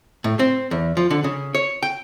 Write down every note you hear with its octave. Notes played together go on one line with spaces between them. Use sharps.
A2
C4
E2
F3
D3
C#3
C#5
G5